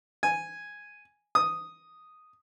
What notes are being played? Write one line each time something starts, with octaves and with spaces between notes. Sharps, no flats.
G#5
D#6